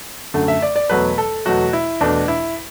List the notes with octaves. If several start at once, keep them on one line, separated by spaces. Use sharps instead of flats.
F#2 D3 A3
E5
D5
D5
E2 B2 F#3 A3 B4
A4
E2 B2 F#3 A3 F#4
E4
E2 B2 A3 D4
E4